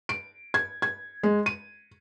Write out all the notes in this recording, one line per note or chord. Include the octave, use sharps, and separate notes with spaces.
D7
G#6
G#6
G#3
D#7